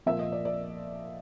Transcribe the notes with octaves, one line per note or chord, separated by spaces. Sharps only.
A#2 F3 E5
D#5
D5
D5